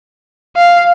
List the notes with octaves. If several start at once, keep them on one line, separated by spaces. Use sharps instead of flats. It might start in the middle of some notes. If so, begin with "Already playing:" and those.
F5